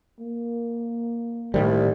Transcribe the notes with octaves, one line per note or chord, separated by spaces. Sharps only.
A#3
C2 A2 D#3 G3